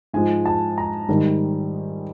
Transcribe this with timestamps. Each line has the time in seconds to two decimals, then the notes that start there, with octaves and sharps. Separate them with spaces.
0.13 G#2 F3 G#3 G#5
0.46 A5
0.78 A#5
1.09 G#2 D#3 G3